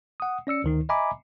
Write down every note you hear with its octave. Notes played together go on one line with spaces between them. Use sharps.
F#5 D#6
C#4 D5 E6 C#7
D2 D#3 D#4
D#5 E5 G#5 A#5 B5 D6